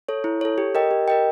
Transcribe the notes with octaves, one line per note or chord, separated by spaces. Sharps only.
A4 C#5
E4
A4 C#5
G4
A#4 D#5 G5
G4
A#4 D#5 G5